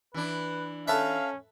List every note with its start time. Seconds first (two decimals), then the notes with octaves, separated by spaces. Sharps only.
0.14 E3 D4 B4
0.88 C#4 A4 B4 E5 F5